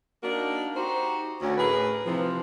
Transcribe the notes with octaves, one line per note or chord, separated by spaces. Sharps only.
A#3 D4 D#4 F#4 A#4
D#4 F#4 G4 C5
D2 C#4
A2 G#4 A#4 B4
C3 E3 F3